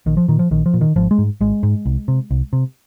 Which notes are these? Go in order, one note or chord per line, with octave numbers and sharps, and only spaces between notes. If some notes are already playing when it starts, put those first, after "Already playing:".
A#1 D#3
F3
A#2 D#3
F3
A#1 D#3
F3
A#2
D#3
G#1 F3
G#3
G#2
G#1 G#3
G#2
C2
C3
C2
C3